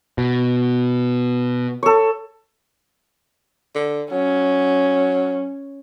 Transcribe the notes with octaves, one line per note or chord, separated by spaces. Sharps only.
B2
A4 C#5
D3
F#3 C#4